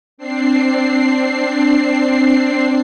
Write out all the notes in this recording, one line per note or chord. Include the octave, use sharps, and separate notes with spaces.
C4 D4 C7